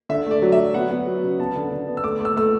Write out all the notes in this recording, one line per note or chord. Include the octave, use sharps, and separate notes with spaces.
D3 E5
A3 D5
F#3
E5
F#3
B3 F#5
B3
F#3
C#3
B3 A5
D3
D3
B3
E6
A3 D6
A3
E6
A3 E6